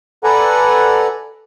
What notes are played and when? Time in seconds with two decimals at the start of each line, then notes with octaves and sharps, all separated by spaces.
0.24 A4 B4 D5 F#5 G#5 A#5